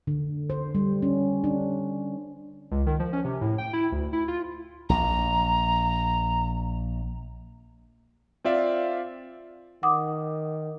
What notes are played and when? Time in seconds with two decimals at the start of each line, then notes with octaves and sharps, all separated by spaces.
0.07 D3
0.50 C5
0.75 G3
1.02 C#4
1.44 D4
2.71 C#2
2.86 D#3
2.99 F3
3.13 C#4
3.24 C3
3.41 A2
3.58 G5
3.73 E4
3.92 D2
4.13 E4
4.28 F4
4.89 A#1 A#5
8.44 C4 F4 D5 E5 F5
9.83 D#3 F#5 D6 D#6